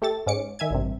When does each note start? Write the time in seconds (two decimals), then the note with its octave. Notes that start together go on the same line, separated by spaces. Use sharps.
0.02 A3 G4 A4 A6
0.27 G#2 C#4 D6 C#7
0.59 D#3 E5 G#5 G#6
0.71 A1 G2 C3